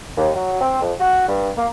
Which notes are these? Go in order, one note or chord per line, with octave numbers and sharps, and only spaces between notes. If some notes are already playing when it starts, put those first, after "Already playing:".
D#2
F#3
C4
F2
F#4
G2
A#3